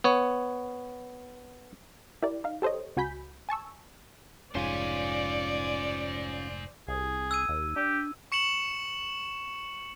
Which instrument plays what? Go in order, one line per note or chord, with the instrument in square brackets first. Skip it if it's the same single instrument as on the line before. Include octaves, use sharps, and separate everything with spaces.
[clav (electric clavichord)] B3 C#5
[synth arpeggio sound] E4 G4 A#4 D5
D#4 F5
G4 A4 C5 C#5 D#5
C#2 F#4 G#5 B5 G6 B6
G#5 A5 C#6 E6
[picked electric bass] F1 G#2 [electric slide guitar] C#4 F4 [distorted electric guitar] C5 G#5 [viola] D5
[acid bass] C2 [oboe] G#4
[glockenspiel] E6 G#6 D#7
[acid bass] D#2
[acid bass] D4 [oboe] G4
[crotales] C#6 C#7 E7 F#7